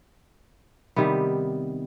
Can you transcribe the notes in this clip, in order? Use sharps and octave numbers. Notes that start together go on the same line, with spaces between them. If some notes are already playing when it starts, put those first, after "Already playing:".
C3 D#3 G3 B3